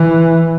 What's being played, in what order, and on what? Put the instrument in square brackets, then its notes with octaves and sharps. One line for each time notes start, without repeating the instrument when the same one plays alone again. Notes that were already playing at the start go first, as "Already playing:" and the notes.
Already playing: [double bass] E3